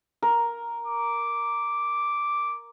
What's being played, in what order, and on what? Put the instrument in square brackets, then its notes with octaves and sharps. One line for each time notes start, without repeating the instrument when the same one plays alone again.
[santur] A#4
[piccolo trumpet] D6